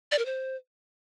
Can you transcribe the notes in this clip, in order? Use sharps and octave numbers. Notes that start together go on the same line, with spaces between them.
D5
A#4
C5